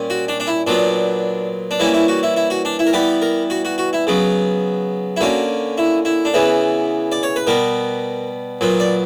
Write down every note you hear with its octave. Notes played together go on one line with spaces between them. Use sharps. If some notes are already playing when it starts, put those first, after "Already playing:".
Already playing: A#2 G3 C#4
F#4
D4
D4
E4
A#2 F#3 B3 D4
D4
E3 G3 A#3 C#4 E4
E4
F#4
E4
E4
F#4
D4
E4
A#4
E3 G3 B3 G4
A#4
F#4
F#4
F#4
E4
C#3 F#3 B3
E4
D3 A#3 C#4 F#4
E4
E4
D4
C#3 E3 B3 E4
D5
C#5
B4
B2 G3 B3 A#4
A#2 F#3 B3
D5